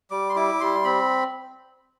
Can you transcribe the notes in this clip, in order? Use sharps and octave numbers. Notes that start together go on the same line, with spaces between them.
G3 D6
C6
E4 D6
G3 C6
C4 B5